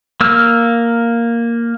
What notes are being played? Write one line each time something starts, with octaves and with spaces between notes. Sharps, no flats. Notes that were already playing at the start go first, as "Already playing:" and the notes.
A#3 E6 F6